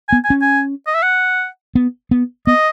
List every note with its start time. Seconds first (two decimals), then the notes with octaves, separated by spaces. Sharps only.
0.09 G#5
0.12 B3
0.25 G#5
0.30 C#4
0.42 G#5
0.87 D#5
0.94 E5
1.03 F#5
1.75 B3
2.11 B3
2.47 B3 D#5